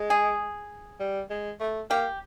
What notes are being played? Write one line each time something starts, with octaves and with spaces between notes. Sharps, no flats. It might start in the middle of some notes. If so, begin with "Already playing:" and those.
Already playing: G#3
G#4
G3
G#3
A3
A#3 G4